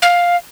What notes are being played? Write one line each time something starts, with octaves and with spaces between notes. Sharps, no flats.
F5